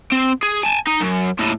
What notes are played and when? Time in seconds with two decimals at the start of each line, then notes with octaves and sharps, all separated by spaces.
0.12 C4
0.43 G#4
0.64 G#5 A5
0.87 D#4
1.01 F#2
1.39 D#2 A2